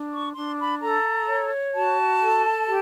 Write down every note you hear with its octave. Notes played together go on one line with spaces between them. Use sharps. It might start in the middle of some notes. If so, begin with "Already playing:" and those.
Already playing: D4
C#6
D4 C6
B5
A4 A#5
C#5
F#4 A5
A4
G4